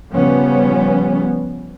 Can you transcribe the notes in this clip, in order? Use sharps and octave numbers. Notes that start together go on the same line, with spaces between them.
C#3 F3 G3 B3 C#4